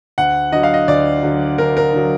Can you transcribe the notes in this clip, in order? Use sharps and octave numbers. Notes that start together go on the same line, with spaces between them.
D2 F#5
D3 F#3 D#5
F5
D#5
D2 D5
D3 F#3
D2 A#4
A#4
D3 F#3